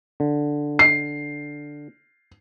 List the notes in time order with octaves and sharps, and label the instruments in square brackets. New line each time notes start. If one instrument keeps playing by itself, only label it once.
[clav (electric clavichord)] D3
[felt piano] C7